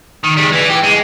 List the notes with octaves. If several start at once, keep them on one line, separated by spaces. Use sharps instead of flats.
D#3
G3 G#3
E3
G4
G#3